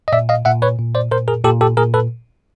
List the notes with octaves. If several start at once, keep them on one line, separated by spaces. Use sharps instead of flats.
D#5
A#2 D5 E5
D#5 F5
A#2 E5 F#5
B4 C#5
A#2
C5 D5
A#2 A#4 C5
G#4 A#4
A#2 G4 A4
G4 A4
A#2 G#4 A#4
A4 B4